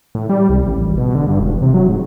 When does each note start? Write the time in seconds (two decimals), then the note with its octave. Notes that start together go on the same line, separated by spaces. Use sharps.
0.15 A2
0.29 G3
0.50 C2
0.66 A1
0.86 G#1
0.98 B2
1.15 D3
1.27 G2
1.40 E1
1.62 C3
1.74 F#3
1.88 G#2